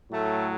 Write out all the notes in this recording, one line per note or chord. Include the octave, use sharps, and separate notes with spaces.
A2 F#3 A3 A4